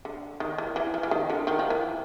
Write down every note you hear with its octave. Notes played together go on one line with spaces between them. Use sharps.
D3
D#3
E3
E3
F3
E3
D#3
D3
D#3
F3
E3